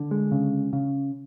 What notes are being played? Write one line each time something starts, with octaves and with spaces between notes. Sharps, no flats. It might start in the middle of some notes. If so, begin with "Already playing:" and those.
Already playing: D3
G#3
C#3
C#3